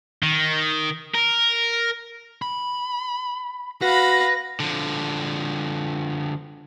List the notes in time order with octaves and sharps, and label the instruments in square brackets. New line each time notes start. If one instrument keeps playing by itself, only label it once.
[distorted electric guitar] D#3
A#4
[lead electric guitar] B5
[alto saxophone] F#4 [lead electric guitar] B4 [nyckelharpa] F5 B5 [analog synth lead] A#6
[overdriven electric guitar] D3 F3